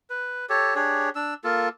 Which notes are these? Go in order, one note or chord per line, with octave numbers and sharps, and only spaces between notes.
B4
G4 A4 C#5
D4 G4 G#4 C#5
D4 E6
A#3 F4 A4